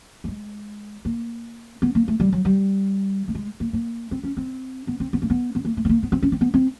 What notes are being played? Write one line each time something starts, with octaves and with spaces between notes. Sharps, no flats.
A3
G#3
A#3
B3
A#3
A3
G3
F#3
G3
A3
G#3
A#3
A#3
C4
C#4
C4
B3
C4
B3
A#3
B3
B3
A#3
A3
B3
A#3
B3
C4
C#4
C4
B3
C4